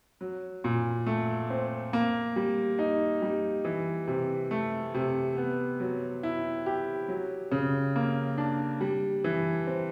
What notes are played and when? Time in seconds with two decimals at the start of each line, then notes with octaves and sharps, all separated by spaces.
0.21 F#3
0.64 A#2
1.06 A3
1.50 C4
1.93 A#3
2.36 G3
2.79 D#4
3.22 G3
3.65 E3
4.07 C3
4.51 A3
4.94 C3
5.37 B3
5.80 F#3
6.23 E4
6.66 G4
7.08 F#3
7.52 C#3
7.96 A#3
8.38 D4
8.81 G3
9.24 E3
9.67 C4